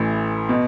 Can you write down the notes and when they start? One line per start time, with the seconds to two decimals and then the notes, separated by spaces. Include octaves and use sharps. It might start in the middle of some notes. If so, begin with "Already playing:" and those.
Already playing: A1 A2 E3
0.49 B2